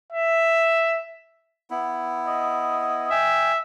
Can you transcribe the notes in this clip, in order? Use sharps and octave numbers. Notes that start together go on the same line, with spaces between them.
E5
B3 E4
D#5
E5 G5 G#5